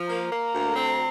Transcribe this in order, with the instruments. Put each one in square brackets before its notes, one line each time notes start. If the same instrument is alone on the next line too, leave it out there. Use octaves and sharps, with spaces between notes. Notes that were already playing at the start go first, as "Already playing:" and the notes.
Already playing: [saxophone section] F3
[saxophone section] A#3 [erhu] A#5
[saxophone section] A#3
D2
C4